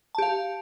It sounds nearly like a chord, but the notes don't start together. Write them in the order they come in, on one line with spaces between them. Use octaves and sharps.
A5 G4 F5